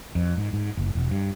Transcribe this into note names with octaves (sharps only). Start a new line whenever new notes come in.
F2
G#2
G#2
F#1
E1
G2